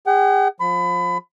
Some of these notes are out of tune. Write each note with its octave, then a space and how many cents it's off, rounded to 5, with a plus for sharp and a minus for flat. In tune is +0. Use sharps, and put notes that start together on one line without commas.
G#4 -40 F#5 +45
F3 +20 B5 +30